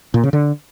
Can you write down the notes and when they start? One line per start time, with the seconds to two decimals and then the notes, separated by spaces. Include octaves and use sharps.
0.14 A#2
0.24 C#3
0.33 D3